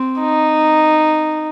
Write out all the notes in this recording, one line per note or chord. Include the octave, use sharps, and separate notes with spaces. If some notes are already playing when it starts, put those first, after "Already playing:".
Already playing: C4
D#4